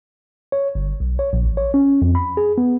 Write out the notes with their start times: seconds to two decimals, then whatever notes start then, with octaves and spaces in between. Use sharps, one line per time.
0.52 C#5
0.75 G1
1.00 B1
1.19 C#5
1.33 A#1
1.45 A1
1.57 C#5
1.74 C#4
2.02 F2
2.15 B5
2.37 G#4
2.58 B3